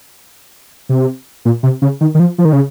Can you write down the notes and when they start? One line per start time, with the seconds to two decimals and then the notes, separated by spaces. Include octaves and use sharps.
0.89 C3
1.45 A#2
1.63 C3
1.82 C#3
2.01 D#3
2.14 D#3
2.20 F3
2.38 F3
2.45 D#3
2.53 C#3